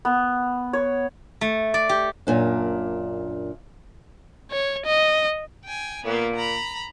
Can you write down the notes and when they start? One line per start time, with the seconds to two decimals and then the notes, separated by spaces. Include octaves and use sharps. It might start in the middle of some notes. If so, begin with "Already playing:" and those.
0.05 B3
0.73 C#5
1.41 A3
1.74 D5
1.89 G4
2.27 F#2 A#2 D4
4.51 C#5
4.86 D#5
5.65 G5 G#5
6.05 A#2 A#3 B3
6.35 A#5 B5